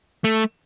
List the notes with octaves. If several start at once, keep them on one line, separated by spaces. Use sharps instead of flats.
A3